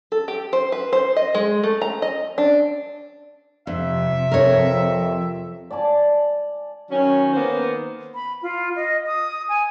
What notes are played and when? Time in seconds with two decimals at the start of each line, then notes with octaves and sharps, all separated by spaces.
0.12 A4
0.28 G4
0.53 C5
0.72 B4
0.93 C5
1.16 D#5
1.35 G#3
1.63 A3
1.82 A#5
2.02 D#5
2.38 D4
3.67 F2 C3 F3 E5
4.32 F2 A#4 C#5
5.70 D5 G#5 A5 D6
6.91 D#3 F#3 C#4
7.34 D#3 A#3 B3 C5
8.15 B5
8.43 F4
8.76 D#5
9.06 D#6
9.49 G#5